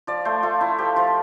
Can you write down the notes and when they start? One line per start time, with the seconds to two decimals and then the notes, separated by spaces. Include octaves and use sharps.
0.07 F3 D5
0.25 A3 C5
0.43 A3 F4
0.61 F3 E4
0.78 F3 G4
0.96 F3 F4